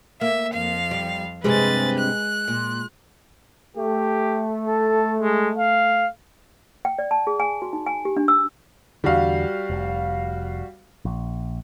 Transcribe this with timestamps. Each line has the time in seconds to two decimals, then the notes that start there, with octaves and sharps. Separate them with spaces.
0.21 A#3 E5
0.53 F2 F5
0.91 G3
1.44 G2 C3 G3 G#3 G#4 B4 D#5 A6
1.99 F#6
2.48 A#2
3.77 A3 G4
4.67 A4
5.20 G#3
5.57 F5
6.85 G5
6.99 D5
7.11 A5
7.27 G#4
7.40 G#5
7.62 F#4
7.73 D#4
7.87 G#5
8.05 G4
8.17 D4
8.28 E6
9.04 E2 D3 G3 F#4 F5
9.70 F1
11.05 A#1